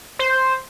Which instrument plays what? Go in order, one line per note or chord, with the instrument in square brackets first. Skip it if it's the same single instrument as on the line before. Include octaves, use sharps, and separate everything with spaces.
[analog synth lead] C5